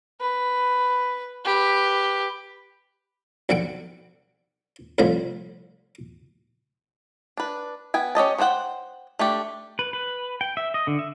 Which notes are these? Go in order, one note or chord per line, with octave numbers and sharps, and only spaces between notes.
B4
G4 B4
B1 D3 A4 F#5 G5
C2 A2 D3 F3 C5 B5
D4 B4
B3 G5 G#5
C#4 G4 D#5 A5
B3 D4 C5 F#5 G5
A3 D4 G4
B4
B4
G5
E5
D#5
D3
E5